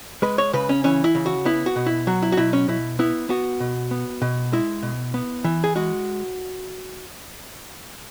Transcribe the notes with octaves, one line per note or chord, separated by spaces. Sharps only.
G#3 B4
C#5
C#3 B4
C#4
E3 C#4
E4
C#3
F#4
B3 E4
F#4
B2
E4
F#3 F#4
E4
F#4
B2 E4
C#4
B2 E4
B3 E4
B3 F#4
B2
B3
B2
G#3 E4
B2
B3
E3
G#4
G#3 F#4